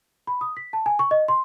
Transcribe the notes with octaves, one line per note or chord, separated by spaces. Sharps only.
B5
D#6
B6
A5
G#5
C#6
D#5
C6